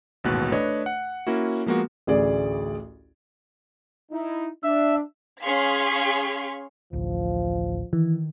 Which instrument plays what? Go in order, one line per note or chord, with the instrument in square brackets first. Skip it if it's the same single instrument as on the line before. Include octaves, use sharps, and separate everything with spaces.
[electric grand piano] A1 D#2 G#2 B2 B4 F#6
A3 D4 B4 C#5 D#5
F#5
A#3 C#4 E4 F#4
F3 G#3 A#3 B3 F#4
[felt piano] A1 D2 G#4 D5
[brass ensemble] D#4 E4
[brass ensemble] D4 [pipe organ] E5
[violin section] C#4 G#4 F5 C6 C#6 B6
[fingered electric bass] A1 D2 [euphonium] F3
[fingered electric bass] D#3 [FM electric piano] E3